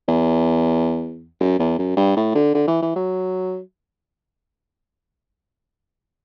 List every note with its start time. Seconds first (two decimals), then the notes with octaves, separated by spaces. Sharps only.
0.08 E2
1.41 F#2
1.59 E2
1.79 F#2
1.97 G2
2.17 A2
2.35 D3
2.54 D3
2.67 E3
2.82 E3
2.96 F#3